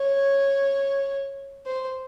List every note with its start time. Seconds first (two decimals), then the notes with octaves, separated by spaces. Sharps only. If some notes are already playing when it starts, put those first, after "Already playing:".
Already playing: C#5
1.66 C5